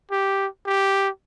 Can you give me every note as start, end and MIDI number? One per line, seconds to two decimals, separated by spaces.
0.11 0.47 67
0.66 1.09 67